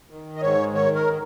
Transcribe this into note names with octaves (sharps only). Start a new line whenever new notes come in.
D#3
D#5
G#2 C#5
D#3 C#5
A#4